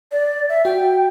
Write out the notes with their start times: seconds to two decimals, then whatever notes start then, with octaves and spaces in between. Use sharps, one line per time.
0.12 D5
0.49 E5
0.65 F#4 G5